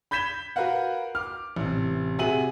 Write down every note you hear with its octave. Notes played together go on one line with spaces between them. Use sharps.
B5 G6 G#6 B6 E7 G7
F#4 A#4 B4 F5 F#5
D6 F6
A1 C3
C3 F#4 G#4 E5 D#7 F#7